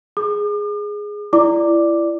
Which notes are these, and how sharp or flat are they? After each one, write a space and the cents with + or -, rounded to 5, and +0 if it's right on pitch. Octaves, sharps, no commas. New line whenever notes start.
G#4 +0 D6 +45
E4 +30 D5 +0 D6 +0